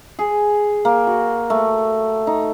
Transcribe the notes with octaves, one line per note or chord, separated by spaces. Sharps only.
G#4
A#3
F#4
A3
D#4